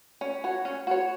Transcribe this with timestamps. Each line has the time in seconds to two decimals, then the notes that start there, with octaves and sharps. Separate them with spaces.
0.21 C#4
0.44 F#4 C#5
0.65 C#4
0.87 F#4 C#5